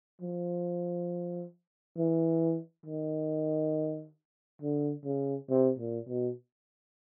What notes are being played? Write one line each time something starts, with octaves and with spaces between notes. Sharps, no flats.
F3
E3
D#3
D3
C#3
C3
A#2
B2